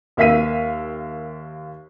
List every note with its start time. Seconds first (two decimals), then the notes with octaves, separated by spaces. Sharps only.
0.17 D#2 A#3 E5 F5 B6 D#7